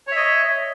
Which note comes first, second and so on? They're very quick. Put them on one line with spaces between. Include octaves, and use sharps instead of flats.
C#5 E5 D#5